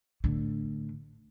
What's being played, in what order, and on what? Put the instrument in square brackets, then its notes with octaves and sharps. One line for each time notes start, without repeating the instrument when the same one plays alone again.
[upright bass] A2 D3